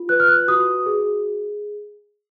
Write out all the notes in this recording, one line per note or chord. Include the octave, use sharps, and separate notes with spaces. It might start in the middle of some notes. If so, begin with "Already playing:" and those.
Already playing: F4
B4 F#6
F6
F#6
F#4 D#6
G#4